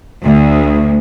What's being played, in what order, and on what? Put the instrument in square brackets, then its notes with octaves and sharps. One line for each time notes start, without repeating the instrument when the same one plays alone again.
[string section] D2